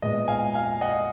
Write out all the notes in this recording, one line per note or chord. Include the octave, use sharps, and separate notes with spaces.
A#2 G#3 B3 D#5
F5 G#5
F5 G#5
D#5 F#5